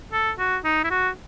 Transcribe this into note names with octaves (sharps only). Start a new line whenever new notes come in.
A4
F#4
D#4
E4
F#4